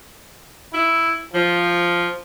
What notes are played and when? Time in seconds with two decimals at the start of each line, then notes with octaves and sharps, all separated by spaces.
0.73 E4
1.34 F3